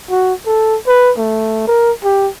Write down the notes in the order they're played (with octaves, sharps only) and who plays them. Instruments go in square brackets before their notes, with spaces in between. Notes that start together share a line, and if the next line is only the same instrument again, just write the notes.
[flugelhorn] F#4
A4
B4
A3
A#4
G4